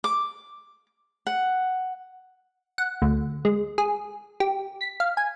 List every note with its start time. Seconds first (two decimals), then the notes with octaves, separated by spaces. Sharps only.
0.04 D6
1.27 F#5
2.78 F#5
3.02 D2
3.45 G#3
3.78 G#4
4.40 G4
4.81 B6
5.00 F5
5.17 G#5